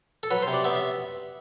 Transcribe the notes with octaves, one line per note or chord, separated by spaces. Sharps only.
A4
F#3 B4
C5
C3
D5
B3 E5
E5